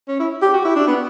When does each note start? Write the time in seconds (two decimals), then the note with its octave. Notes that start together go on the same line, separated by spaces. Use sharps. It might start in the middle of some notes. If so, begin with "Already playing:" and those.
0.08 C#4
0.20 E4
0.42 G4
0.53 F#4
0.65 E4
0.76 D4
0.87 B3